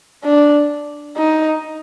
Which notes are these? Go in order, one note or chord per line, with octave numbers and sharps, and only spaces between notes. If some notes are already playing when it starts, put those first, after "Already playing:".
D4
D#4